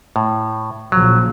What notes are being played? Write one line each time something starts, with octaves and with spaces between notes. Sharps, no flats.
A2
A#1 C#3 F3 F#3